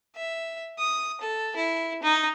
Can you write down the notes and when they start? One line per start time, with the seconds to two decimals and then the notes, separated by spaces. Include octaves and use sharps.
0.16 E5
0.79 D#6
1.21 A4
1.56 E4
2.03 D#4